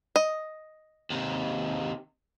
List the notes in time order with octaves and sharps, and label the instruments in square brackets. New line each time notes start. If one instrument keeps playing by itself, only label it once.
[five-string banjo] D#5
[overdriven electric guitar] D#2 C3